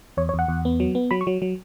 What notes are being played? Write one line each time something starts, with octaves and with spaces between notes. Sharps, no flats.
E2 C#5
C#5
E2 F#5
E2
B3
F#3
B3
F#3 B5
C#6
F#3
F#3